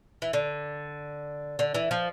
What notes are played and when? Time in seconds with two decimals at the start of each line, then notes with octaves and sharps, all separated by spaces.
0.22 E3
0.33 D3
1.59 D3
1.75 E3
1.91 F3